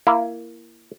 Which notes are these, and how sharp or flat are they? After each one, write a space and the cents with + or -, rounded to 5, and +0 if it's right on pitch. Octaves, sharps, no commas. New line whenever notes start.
A#3 +0 E4 +25